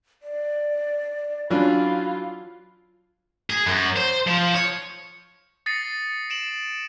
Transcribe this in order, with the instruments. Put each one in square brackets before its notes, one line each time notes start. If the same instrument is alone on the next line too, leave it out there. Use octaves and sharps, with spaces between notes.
[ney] D5
[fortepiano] E3 C#4 D4 [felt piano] F#3 [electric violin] F4 [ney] B5
[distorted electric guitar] G#4
F#2
C5
F3
C#5
[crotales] D#6 A6 A#6 C7 C#7 D#7
D7 E7 F#7